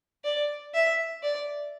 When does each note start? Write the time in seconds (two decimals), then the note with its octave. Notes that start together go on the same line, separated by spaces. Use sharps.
0.24 D5
0.74 E5
1.22 D5